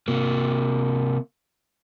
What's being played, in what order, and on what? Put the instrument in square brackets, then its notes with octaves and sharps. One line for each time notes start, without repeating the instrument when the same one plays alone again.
[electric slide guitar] C3 A#3